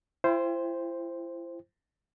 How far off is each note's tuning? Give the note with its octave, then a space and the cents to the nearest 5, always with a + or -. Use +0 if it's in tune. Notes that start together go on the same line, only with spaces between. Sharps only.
E4 +40 C5 +0 G5 +25